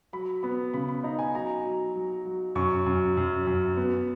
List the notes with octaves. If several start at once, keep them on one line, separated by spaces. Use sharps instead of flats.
F#3 B5
B3 B5
C#3 B5
B5
D#4 A#5
G#5
F#3 A#5
F#3
F#3
F#3
F#2 C#6
F#2
F#2
F#2
B3